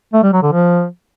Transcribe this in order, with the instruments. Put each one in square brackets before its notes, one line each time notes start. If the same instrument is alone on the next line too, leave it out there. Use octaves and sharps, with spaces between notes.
[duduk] A3
G3
F#3
D3
F3